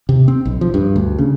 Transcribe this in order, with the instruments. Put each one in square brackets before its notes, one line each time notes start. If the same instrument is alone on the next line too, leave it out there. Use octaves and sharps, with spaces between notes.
[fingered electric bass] C3
C4
B1
F3
G2
D2
C#3